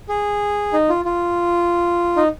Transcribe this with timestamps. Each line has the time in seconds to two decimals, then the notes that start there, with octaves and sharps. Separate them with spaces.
0.09 G#4
0.73 D#4
0.89 F4
1.05 F4
2.17 D#4